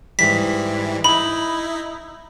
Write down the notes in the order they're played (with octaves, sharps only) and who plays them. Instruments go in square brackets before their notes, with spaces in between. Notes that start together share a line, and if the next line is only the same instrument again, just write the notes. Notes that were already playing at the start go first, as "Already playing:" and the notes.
[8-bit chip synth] G#2 E3 G3 [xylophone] B6
[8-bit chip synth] D#4 E4 [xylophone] B5